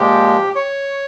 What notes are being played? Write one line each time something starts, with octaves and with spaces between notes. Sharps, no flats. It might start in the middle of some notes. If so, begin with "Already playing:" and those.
Already playing: A#2 F3 G#3 G4
C#5